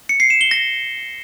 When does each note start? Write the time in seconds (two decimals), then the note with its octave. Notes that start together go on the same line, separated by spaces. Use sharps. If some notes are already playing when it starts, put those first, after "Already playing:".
0.09 C#7
0.20 C7
0.30 E7
0.41 G7
0.51 A#6